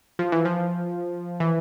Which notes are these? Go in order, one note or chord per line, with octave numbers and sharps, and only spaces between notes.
F3
E3
F3
E3